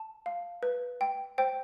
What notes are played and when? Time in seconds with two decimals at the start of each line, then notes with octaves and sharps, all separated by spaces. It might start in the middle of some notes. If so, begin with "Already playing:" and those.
Already playing: A5
0.26 F5
0.63 B4
1.01 G5
1.38 C5 G5